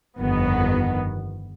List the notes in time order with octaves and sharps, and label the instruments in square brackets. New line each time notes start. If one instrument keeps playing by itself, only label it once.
[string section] G1 F2 D#3 B3